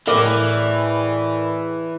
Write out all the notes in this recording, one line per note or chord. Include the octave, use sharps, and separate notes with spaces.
A2 E3 G#4 A#4 D5